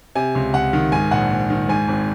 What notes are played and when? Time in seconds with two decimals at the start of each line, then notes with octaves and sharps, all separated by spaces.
0.15 C3 G#5
0.35 C#2
0.54 C#2 F#5
0.73 D#3
0.92 G#2 G#5
1.11 A#1 F#5
1.31 A#1
1.50 D#3
1.69 G#2 G#5
1.88 G#1